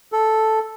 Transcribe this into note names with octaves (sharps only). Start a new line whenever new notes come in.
A4